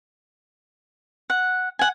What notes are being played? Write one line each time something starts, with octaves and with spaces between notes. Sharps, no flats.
F#5
F#5 G#5